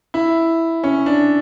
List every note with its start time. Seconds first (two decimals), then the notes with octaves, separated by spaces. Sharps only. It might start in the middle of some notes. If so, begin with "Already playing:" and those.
0.14 E4
0.84 C#4
1.06 D4